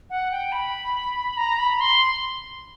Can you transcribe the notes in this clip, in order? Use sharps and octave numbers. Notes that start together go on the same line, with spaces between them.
F#5
G5
B5
A#5
B5
C6